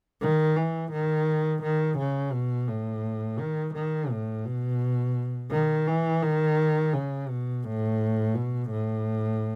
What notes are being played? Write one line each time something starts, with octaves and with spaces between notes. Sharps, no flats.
D#3
E3
D#3
D#3
C#3
B2
A2
D#3
D#3
A2
B2
D#3
E3
D#3
C#3
B2
A2
B2
A2